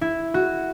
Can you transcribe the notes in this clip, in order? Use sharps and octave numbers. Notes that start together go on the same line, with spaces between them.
E4
F#4